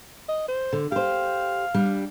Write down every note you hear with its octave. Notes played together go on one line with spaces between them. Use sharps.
D#5
C5
D3
G4 C5 F5
G3 D4